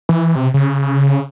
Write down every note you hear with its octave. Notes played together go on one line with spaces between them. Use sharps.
E3
C3
C#3